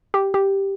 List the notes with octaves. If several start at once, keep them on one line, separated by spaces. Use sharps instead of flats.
G4
G4